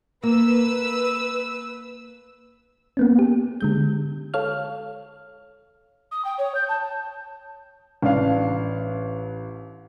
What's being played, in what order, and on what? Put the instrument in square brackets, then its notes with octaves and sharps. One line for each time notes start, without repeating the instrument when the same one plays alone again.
[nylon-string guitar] A#3 [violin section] B4 E6
[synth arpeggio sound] A#3 B3 C#4
G4
D3 G#3 G6
A4 C#5 F5 F6
[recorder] D#6
G5
C#5
G6
A5
[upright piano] A1 D4 F5